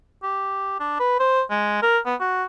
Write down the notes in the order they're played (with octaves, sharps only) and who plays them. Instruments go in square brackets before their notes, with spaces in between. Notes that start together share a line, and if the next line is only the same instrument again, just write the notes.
[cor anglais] G4
D4
B4
C5
G#3
A#4
B3
F#4